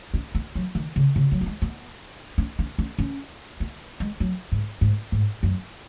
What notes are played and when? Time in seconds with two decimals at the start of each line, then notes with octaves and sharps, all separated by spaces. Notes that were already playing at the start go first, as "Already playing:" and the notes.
0.14 C#4
0.35 B3
0.55 F#3
0.75 D#3
0.96 C#3
1.16 C#3
1.32 F#3
1.41 B3
1.46 G#3
1.62 B3
2.38 C#4
2.59 C#4
2.78 C#4
2.99 C#4
3.60 B3
4.00 G#3
4.20 F#3
4.52 G#2
4.81 G#2
5.12 G#2
5.43 F#2